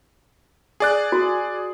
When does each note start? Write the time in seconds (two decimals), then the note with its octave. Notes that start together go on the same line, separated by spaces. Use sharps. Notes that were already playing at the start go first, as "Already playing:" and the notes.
0.80 G#4 D5 F#6
1.12 F#4